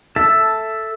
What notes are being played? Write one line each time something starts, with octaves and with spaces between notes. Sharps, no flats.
A4 E5 A5